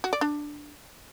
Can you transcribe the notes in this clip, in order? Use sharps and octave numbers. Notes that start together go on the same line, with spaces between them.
F#4
D5
D4